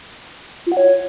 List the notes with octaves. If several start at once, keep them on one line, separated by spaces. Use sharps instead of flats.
F4
F#5
C#5